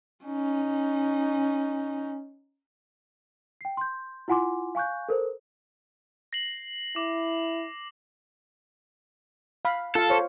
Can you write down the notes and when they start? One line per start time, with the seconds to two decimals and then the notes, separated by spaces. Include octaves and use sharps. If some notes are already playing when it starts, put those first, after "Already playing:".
0.25 C#4 D#4
3.61 G5 C7
3.77 C6 G6
4.28 E4 F4 F#5 G#5 C6 D6
4.75 F5 G#5 C#6 F#6 G6
5.09 A4 A#4 C5
6.33 A#6 C7 F#7
6.96 E4 D6
9.65 F5 B5
9.95 F4 A4 F5
10.09 C5 C#5 F5